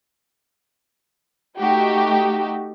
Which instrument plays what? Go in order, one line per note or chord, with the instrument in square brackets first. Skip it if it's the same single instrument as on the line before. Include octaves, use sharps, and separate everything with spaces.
[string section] A3 D#4 F#4 G4